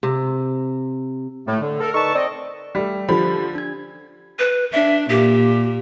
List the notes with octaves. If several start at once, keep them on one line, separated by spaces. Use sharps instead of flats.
C3
A2 A3
D3
A4 A#4
D#4 A4 B4 D5 A5 C#6
C4 D5 D#5
G3 A3
D3 F3 F4 G4 C5 B5
D4 G#6
B4
D4 E5
A#2 G4